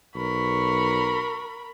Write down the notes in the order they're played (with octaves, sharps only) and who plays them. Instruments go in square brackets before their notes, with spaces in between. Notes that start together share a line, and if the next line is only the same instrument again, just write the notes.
[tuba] B1 [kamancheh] A#4 B5 [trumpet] C#6